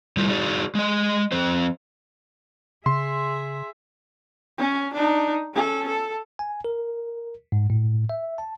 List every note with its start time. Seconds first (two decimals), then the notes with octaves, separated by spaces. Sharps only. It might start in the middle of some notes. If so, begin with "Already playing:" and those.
0.17 G3 A3 E4 F4
0.30 D#4 F#4 G#4 D5
0.75 G#3 D#5
1.32 F3 C4 C5
2.86 C#3 G#4 E5 C6
4.58 C#4
4.94 D4 D#4
5.54 C#4 A4
5.88 A4
6.39 G#5
6.65 A#4
7.52 G#2
7.70 A2
8.09 E5
8.38 A5